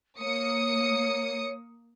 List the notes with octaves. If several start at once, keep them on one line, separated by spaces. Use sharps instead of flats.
A#3 C#5 D#6 C#7